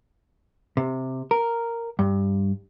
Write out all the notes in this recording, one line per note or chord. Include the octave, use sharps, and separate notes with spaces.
C3
A#4
G2